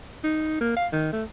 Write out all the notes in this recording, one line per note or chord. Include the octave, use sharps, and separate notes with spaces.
D#4
A#3
F5
D#3
A3